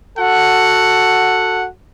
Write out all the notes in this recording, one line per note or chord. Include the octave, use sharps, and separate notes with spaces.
F#4 A4 F#5